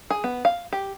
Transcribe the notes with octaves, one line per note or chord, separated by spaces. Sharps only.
G#4
B3
F5
G4